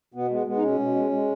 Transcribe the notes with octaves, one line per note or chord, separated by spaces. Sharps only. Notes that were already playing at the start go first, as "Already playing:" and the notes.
B2 B3
G#3 B3
G#3 B3
D#4
B2 C#4
B2
G#3
G#3